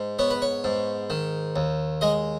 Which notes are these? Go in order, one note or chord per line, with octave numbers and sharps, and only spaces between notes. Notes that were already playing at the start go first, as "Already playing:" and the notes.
Already playing: G#2
B3 C#5
B4
C#5
G#2
D#3
D#2
G#3 D#5